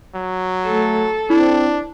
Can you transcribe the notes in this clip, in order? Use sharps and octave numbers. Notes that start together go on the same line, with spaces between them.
F#3
A3 A4
C4 D4 E4